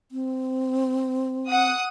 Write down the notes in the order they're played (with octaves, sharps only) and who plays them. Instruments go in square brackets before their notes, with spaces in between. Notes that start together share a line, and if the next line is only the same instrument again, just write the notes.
[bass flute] C4
[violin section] F#5 D#6